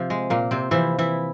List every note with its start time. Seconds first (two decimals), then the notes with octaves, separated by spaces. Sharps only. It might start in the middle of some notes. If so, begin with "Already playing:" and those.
Already playing: C3 F3
0.10 G#3
0.30 A#2 A#3
0.51 C3 C4
0.71 C3 E3 F3 E4
0.99 E3 E4